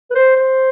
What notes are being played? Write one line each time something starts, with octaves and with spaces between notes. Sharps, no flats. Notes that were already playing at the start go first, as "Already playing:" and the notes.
B4
C5
C5